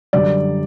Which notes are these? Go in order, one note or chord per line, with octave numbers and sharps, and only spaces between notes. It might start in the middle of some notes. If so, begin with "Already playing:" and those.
F#2 D3 G3 D5